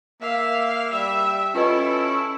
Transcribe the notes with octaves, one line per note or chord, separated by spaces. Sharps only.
A#3 E5 F5
G3 E5
C#4 E4 F4 A4 B4 D#5